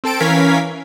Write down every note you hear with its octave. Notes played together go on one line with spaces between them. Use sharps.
C4 A4 A5 D7
E3 C#4 A#4 F5 G#6 B6